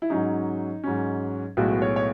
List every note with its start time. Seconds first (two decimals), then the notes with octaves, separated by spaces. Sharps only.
0.02 E4
0.10 G#2 F#3 C#4 D#4
0.84 G#2 F#3 C#4
1.57 B1 A2 G#3 B3 F#4
1.82 C#5
1.96 C#5